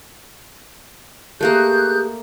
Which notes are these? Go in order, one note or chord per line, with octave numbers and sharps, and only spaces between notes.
A3 A#3 G4 G#4 A#4 F#6 G6